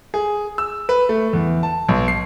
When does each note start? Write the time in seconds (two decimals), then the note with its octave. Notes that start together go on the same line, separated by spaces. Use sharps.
0.14 G#4
0.58 E6
0.89 B4
1.09 A3
1.33 E2
1.63 A5
1.88 B1
2.08 C7